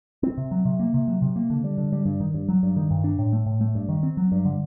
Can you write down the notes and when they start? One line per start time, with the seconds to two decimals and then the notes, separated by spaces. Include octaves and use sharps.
0.23 C4
0.37 C3
0.51 F#3
0.65 C3
0.79 A#3
0.94 C3
1.08 F#3
1.22 C3
1.36 A#3
1.50 D3
1.64 G3
1.78 D3
1.92 G3
2.06 G2
2.20 D#3
2.34 G2
2.48 F#3
2.63 G2
2.76 D#3
2.91 G2
3.04 D4
3.19 A2
3.33 A3
3.46 A2
3.61 A3
3.75 G2
3.89 D#3
4.03 C4
4.17 F#3
4.32 G2
4.45 D3